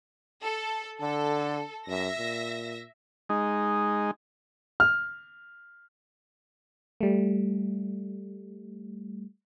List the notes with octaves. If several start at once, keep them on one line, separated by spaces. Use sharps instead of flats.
A4
D3 A4
F#2 E5 A#6
A#2
G#3 D#4
F6
G3 A3